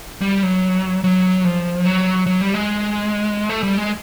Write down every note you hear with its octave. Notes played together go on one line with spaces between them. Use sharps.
G3
F#3
F#3
F3
F#3
F#3
G3
G#3
A3
G3
G#3